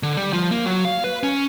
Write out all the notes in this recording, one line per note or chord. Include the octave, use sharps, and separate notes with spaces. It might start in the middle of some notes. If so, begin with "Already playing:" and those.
D3
G3
F3
A#3
F#3
F5
B4
C#4